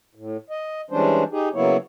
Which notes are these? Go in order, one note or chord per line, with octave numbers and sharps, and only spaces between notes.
A2
D#5
E3 G3 G#3 C#4 D4 C5
D#4 G4 G#4
C#3 F#3 A#3 B3 E4 C#5